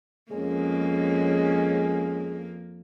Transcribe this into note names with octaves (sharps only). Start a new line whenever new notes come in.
F2 G#3 A#3 C#4 G#4